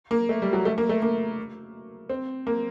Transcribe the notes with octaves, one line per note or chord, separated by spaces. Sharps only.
A#3
A3
G3
F#3
A3
A#3
A3
A#3
C4
A#3